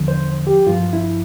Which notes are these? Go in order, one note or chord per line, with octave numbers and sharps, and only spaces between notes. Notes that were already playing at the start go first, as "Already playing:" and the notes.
Already playing: E2 D3 F3
C5
G4
G2 F3 F4
E4